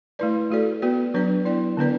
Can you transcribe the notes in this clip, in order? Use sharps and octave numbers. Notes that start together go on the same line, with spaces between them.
A3 E4 B4 D5
A3 F#4 A4 D5
B3 F#4 B4 D5
F#3 D4 B4 D5
B3 E4 D5
D3 B3 D4 B4 D5